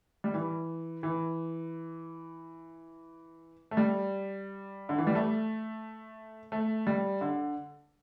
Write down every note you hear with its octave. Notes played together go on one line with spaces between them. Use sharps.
G3
E3
E3
A3
G3
D3
E3
G3
A3
A3
G3
D3